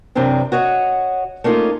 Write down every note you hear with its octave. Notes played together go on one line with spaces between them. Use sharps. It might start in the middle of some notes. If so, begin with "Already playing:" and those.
F#2 C3 E3 C4 D4
F#4 C#5 D#5
A3 A#3 C#4 D#4 F4